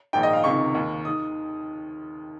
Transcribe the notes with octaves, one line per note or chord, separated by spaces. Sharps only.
A#1 G#2 D#3 G5
D#5
F5
C#2 C3 D#3 C#6
D#2 D#3
D#3 D#6